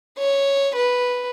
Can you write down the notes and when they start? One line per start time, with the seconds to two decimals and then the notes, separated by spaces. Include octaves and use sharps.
0.18 C#5
0.76 B4